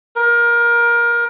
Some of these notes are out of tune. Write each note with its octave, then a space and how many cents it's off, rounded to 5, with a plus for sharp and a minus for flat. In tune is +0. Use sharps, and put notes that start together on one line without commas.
A#4 +20